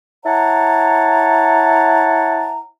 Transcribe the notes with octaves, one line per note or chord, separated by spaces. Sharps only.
E4 C#5 F#5 A5 A#5